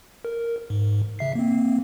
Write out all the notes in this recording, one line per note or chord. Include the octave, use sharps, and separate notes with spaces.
A#4
G#2
C#3 E5 C7
A#3 C4